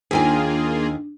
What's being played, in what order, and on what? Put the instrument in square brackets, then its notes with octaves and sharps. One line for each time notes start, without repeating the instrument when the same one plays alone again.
[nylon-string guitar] D#2 D#3 G#5 [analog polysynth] A#3 F4 G#4 [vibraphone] D4